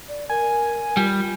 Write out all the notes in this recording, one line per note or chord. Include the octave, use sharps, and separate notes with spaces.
D5
A#4 G#5
G3 F4